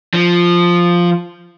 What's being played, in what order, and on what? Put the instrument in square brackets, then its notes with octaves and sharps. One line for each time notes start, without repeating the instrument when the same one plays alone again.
[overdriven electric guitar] F3